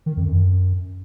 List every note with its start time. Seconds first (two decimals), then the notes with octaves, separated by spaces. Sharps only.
0.06 D#3
0.17 F2
0.27 F#2